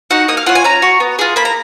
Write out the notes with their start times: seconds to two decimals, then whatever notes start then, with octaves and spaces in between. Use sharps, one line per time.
0.10 D#4 F#4 F#5
0.28 A#3 D#5
0.37 F5
0.46 C#4 F4 F#5
0.55 G#5
0.64 C#4 A#5
0.82 F#4
1.00 B3
1.19 F4 G#4
1.36 A#3 B5
1.45 A#5